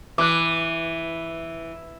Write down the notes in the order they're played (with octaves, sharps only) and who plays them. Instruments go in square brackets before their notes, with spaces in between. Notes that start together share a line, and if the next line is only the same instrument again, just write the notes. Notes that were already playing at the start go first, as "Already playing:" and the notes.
[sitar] E3 [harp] D6 F#6